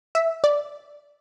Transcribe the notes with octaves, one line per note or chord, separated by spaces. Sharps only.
E5
D5